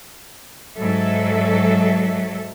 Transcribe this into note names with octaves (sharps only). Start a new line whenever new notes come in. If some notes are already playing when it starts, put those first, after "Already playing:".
G#2 F#3 A4 E5